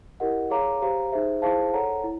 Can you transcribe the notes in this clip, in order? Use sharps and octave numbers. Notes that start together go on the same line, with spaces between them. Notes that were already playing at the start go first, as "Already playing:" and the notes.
E4 G4 A#4 D#5 F#5
G#4 C#5 F5 A#5 D6
G4 C5 F5 A#5
D#4 G#4 C5 E5
E4 G#4 C5 F5 A5
A4 C#5 F#5 A#5
E4